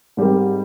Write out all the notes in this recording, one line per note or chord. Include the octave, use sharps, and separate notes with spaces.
G#2 G3 C4 G4 A#4